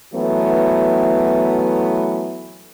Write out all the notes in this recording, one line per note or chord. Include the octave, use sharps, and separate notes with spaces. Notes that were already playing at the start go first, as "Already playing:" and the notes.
E3 F#3 A3 B3